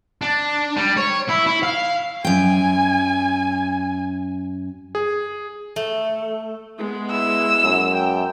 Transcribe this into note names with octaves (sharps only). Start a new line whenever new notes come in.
D4
G3
C#5
E4
E4
F5
F#2 G5 G#5
G#4
A3
G#3 B3
E4 E6
F#2
G5